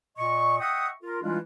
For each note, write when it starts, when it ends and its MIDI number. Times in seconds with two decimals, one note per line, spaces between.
0.18 0.59 46
0.18 0.59 75
0.18 0.59 85
0.60 0.88 75
0.60 0.88 76
0.60 0.88 78
0.60 0.88 79
0.60 0.88 85
0.60 0.88 87
1.03 1.22 65
1.03 1.22 70
1.23 1.38 52
1.23 1.38 55
1.23 1.38 56
1.23 1.38 62
1.23 1.38 64
1.23 1.38 65